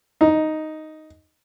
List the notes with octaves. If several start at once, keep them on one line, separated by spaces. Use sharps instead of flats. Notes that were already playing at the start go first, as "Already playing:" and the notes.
D#4